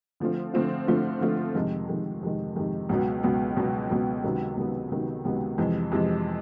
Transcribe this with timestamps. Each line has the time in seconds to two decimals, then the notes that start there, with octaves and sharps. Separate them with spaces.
0.20 D3 F3 A3 C4 F4
0.54 D3 F3 A3 C4 F4
0.88 D3 F3 A3 C4 F4
1.21 D3 F3 A3 C4 F4
1.55 F2 C3 D#3 G#3
1.89 F2 C3 D#3 G#3
2.22 F2 C3 D#3 G#3
2.56 F2 C3 D#3 G#3
2.89 C#2 B2 F#3 B3
3.23 C#2 B2 F#3 B3
3.56 C#2 B2 F#3 B3
3.90 C#2 B2 F#3 B3
4.24 C#2 C3 D#3 F#3 B3
4.57 C#2 C3 D#3 F#3 B3
4.91 C#2 C3 D#3 F#3 B3
5.25 C#2 C3 D#3 F#3 B3
5.58 F2 C3 E3 G#3
5.92 F2 C3 E3 G#3